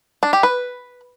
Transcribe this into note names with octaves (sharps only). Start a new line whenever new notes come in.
D4
G4
B4